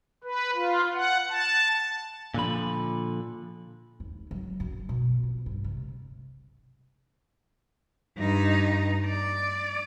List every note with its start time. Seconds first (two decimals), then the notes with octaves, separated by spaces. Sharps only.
0.24 B4
0.55 F4
0.94 F#5
1.29 A5
2.34 A#2 D3 F3 B5
4.00 D#2
4.31 F#3
4.60 F#2
4.89 B2
5.23 F2
5.46 G2
5.64 C3
8.17 G2 D#4
9.06 D5